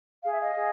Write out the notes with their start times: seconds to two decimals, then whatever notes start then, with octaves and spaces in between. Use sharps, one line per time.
0.23 G#4 F5
0.32 E5
0.40 D#5 F5
0.55 G#4